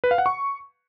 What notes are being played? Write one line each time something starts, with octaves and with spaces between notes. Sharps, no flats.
B4
F5
F#5
C#6